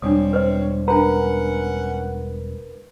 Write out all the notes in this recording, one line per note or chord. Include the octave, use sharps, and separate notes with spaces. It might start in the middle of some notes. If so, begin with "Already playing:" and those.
E1 G3 C4 D4 C#5 D#6
B4 C5 D#5
C#4 D4 A#4 B4 F#5 A#5